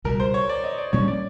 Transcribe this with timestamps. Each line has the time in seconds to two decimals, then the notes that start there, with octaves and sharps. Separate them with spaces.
0.04 C#2 B2 G3 A#4
0.20 C5
0.34 C#5
0.49 D5
0.64 D#5
0.78 D5
0.93 A#2 G3 A#3 C#4 C#5
1.08 D5